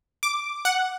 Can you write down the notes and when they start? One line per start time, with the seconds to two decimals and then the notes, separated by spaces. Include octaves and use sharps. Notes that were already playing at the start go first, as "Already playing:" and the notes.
0.23 D6
0.65 F#5